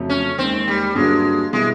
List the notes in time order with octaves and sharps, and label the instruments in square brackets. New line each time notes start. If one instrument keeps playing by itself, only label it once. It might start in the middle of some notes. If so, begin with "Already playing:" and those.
Already playing: [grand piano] F2 C#3 F#3 A3
[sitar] C#4
[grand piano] D#2 D#3 G#3 [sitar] C4
[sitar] G3
[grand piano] G2 D3 F#3 A#3 [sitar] G#3
[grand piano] B2 G3 B3 E4 [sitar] G#3